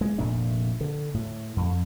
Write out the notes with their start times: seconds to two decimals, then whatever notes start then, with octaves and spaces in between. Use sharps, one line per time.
0.01 G#3
0.18 F1 A#2 A3 D4
0.81 D3
1.14 A2
1.57 F2